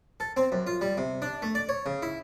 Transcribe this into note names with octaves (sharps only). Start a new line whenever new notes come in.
A4
C4
F#2
F4
G3
C3
D4
A3
D5
C#5
C#3
E4